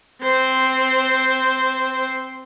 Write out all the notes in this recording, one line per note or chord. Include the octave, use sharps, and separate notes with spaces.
C4 C5